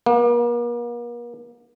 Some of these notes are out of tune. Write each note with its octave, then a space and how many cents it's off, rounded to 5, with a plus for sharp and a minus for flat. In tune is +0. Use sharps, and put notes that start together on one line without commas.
A#3 +45